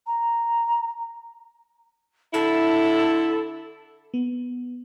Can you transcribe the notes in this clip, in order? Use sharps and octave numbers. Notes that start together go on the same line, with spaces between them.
A#5
D3 E4 A4
B3